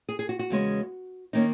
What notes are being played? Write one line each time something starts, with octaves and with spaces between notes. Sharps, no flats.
G#4
G#4
F#4
F#4
E2 C#3 G#3 C#4
D#3 A#3 C#4 D#4